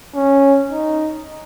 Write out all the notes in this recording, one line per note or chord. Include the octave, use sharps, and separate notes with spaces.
C#4
D#4